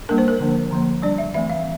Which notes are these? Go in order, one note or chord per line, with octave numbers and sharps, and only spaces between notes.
G3 A#3 D4 A#4
C5
A#4
D3 F3 A#3 D4
D3 F3 A#3
G3 D4 D5
E5
E3 A3 C4 E5
F5